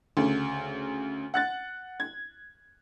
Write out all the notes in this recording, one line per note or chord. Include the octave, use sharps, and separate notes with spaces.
D2 C#3
F#5 F#6 A6
G#6